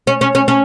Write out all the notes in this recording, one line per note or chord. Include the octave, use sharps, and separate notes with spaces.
C#4
C#4
C#4
C#4